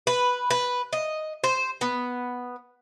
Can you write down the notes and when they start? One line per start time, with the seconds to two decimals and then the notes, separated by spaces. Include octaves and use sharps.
0.07 B4
0.50 B4
0.93 D#5
1.44 C5
1.81 B3